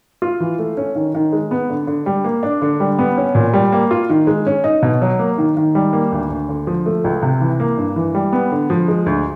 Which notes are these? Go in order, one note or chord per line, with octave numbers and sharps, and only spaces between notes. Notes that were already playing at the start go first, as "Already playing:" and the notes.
F4
E3
A3
C#4
D#3
D#3
G#3
B3
D3
D3
G3
A#3
D4
D3
G3
B3
C#4
A#2
G3
A#3
F4
D#3
G#3
C#4
D#4
B2
F#3
A#3
D#3
D#3
G3
A#3
D2
D2
D3
F3
A3
C#2
C3
E3
A#3
G2
E3
G3
B3
D3
F3
G#3
D2